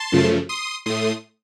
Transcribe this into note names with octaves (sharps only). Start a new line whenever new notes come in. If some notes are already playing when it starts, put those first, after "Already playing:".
Already playing: A5 C6
F#2 C#3 F3 A3
C6 D#6
A2 A3 C6 D#6